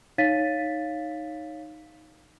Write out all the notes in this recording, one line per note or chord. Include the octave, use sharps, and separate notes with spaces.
D#4 C#5 F5 A6 B6 D#7